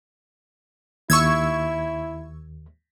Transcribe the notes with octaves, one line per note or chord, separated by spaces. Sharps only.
D#2 E4 C#6 E6 G#6